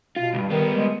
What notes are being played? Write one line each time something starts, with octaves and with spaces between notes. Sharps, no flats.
B2 F4
C#2 G2
D#3 G3 B3
G#3